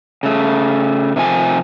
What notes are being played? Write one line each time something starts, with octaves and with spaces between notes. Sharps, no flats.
C#3 A3
C3 D#3 F3 G#5